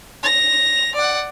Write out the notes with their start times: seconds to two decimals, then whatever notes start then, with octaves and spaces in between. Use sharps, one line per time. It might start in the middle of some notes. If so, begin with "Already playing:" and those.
0.23 A#6 F7
0.95 D5 F#5